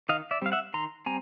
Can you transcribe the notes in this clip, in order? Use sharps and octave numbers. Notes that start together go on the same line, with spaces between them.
D#3 D#5 F5
D5 E5
G3 C4 F5
E5 F#5
D#3 A#5 C6
G3 C4 G#5 A#5